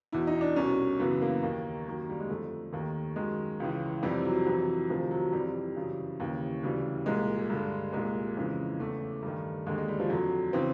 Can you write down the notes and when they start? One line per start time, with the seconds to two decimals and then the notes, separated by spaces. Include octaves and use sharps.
0.12 E2 B2 E4
0.27 D#4
0.41 D4
0.56 C2 B2 C#4
0.99 F#2 C#3 E3 B3
1.22 A#3
1.43 D#2 D#3
1.87 F#2 D#3
2.09 G3
2.20 G#3
2.29 F2 D3 A3
2.72 D#2 D#3
3.16 F#2 D#3 G#3
3.60 C#2 C#3 E3
4.03 F2 C3 E3 G3
4.25 F#3
4.47 F2 C3 E3
4.89 D2 C3 D#3 F3
5.11 F#3
5.32 F2 C3 E3 G3
5.76 F#2 C#3 E3
6.20 D#2 C#3 E3
6.63 D2 C#3 E3 G3
7.06 C2 A#2 G#3
7.50 G2 D3
7.93 C2 A#2 G#3
8.37 F2 C#3 E3
8.79 E2 C#3 E3 A3
9.23 G2 D#3
9.66 D#2 G#3
9.69 D3
9.78 G#3
9.88 G3
10.00 F3
10.10 F2 D3 F#3
10.53 C#3 E3 C4